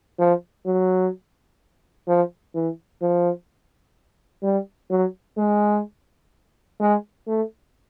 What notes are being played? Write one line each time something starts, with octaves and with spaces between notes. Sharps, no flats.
F3
F#3
F3
E3
F3
G3
F#3
G#3
G#3
A3